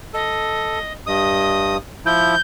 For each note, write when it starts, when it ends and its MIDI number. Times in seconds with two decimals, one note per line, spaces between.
0.14 0.79 69
0.14 0.92 75
1.07 1.77 43
1.07 1.74 75
1.07 1.77 87
2.06 2.35 53
2.06 2.35 64
2.06 2.41 91